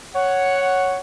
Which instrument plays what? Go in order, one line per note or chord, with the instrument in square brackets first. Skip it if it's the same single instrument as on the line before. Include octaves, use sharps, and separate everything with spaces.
[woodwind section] C#5 F#5